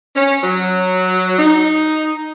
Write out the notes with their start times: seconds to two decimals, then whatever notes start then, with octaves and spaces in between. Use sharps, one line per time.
0.16 C#4
0.43 F#3
1.38 D#4